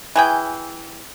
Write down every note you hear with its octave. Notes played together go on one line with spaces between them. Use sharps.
E3 G#4 G5